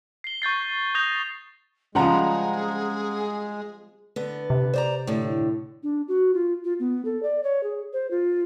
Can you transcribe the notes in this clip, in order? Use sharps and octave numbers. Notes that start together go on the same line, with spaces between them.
C7 G7
C#6 G6 A6 C7
D#6 G6 A#6 F7
C#3 F3 G3 G#3 C4 G#4 F#5 A#5
D3 B3
C3
C5 D5 A#5
A2 D3
D4
F#4
F4
F4
B3
A4
D5
C#5
G#4
C5
F4